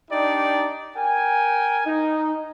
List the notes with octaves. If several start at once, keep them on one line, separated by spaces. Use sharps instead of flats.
D4 D#4 G4 D5 G5
A#4 G5 G#5
D#4